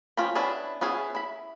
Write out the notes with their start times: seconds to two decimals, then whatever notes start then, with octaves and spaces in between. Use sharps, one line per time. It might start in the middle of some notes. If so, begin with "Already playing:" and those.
0.17 F3 C#4 F4 G5 B5
0.35 B3 C#4 D4 E4 B4
0.81 B3 C#4 E4 G#4
1.15 E4 B5